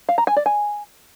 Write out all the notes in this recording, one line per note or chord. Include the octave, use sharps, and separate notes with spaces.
F5
A#5
G#5
D5
G#5